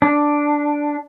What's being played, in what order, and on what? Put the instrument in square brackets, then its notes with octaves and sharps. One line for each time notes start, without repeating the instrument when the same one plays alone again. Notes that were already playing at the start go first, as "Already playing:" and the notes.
[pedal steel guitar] D4